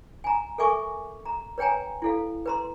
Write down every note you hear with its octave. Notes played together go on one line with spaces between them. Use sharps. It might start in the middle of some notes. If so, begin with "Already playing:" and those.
G#5 A#5
A4 A#4 E5 G#5 C#6 D6
A#5
B4 C#5 G5 G#5 A#5
E4 A4 F5
B4 A#5 C6